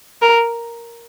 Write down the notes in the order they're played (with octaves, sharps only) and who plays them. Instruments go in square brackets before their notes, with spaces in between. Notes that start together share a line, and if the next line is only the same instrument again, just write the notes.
[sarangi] A#4